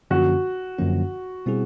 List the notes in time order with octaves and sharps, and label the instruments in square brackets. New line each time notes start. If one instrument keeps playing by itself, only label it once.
[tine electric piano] F#2 D3 F3 A#3 C#4 [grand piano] F#4
[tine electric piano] F#2 D3 F3 A#3 C#4
B2 G3 C4 E4 G#4